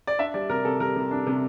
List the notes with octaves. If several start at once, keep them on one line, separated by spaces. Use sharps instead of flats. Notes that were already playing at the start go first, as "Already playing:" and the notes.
D5
D4 E5
G3 D5
C3 A#4
C3 A4
G3 A#4
C3
D4
C3